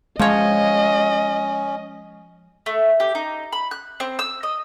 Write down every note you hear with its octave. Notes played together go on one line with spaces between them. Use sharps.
F3 G#3 C#4 C#5 D#5
A3
G4
D#4
B5
F#6
C4
E6
D#5